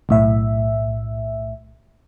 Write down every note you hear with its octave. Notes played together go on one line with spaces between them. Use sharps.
B1 A2 E5